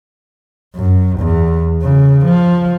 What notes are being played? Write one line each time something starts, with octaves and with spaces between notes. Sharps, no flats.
F#2
E2
C#3
F3